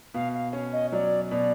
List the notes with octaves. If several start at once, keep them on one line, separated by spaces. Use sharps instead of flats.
B2 F5
F5
C#4
D#5
F#3 D5
B2 D5